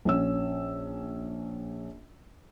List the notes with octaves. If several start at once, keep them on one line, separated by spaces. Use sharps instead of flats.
A#1 C#4 E6